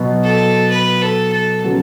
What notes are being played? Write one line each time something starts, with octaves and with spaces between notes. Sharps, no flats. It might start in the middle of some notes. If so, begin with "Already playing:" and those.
Already playing: B2 F#3 B3 F#4
A4
B4
A4
A4
C#3 F#3 B3